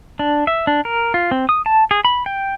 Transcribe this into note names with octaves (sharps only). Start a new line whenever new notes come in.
D4
E5
D4
A#4
F4
C4
D#6
A5
G#4
B5
G5